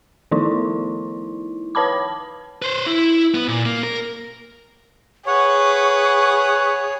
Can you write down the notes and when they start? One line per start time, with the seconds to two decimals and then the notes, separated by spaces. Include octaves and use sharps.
0.31 D#3 F3 D#4 E4
1.75 B4 C#5 A5 B5 D6
2.62 B4 C5
2.86 E4
3.34 B3 B4
3.48 A#2
3.65 A#3
3.83 A#4
5.27 G#4 B4 C#5 F#5 C#6